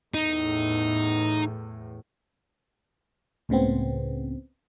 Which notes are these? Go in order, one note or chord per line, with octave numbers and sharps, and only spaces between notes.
E2 A2 D#4
C#2 A2 C#3 B3 C4